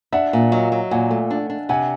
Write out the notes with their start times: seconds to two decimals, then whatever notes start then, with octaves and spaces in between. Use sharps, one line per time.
0.12 D4 E5 F#5
0.33 A#2
0.52 F#3 D#5 F5
0.72 F#3
0.91 A#2 F#5 G#5
1.11 A3
1.30 D4
1.50 D4
1.69 C3 F#5 G#5